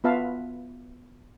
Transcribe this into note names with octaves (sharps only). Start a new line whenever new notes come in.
B3 F4 B4 E5 F5 A5